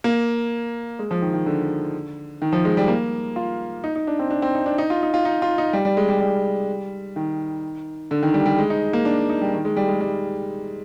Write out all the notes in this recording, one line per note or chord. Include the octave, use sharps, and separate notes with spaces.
A#3
G#3
F3
D#3
D#3
D3
D#3
F3
G#3
G3
A#3
F4
D#4
D#4
D4
C4
D4
C4
D#4
D4
D#4
F4
D#4
F4
D#4
F4
D#4
G3
G3
G#3
G3
G3
D#3
D3
D#3
G3
G3
G#3
D#4
A#3
D4
D#4
G3
D#3
G#3
G3
G#3
G3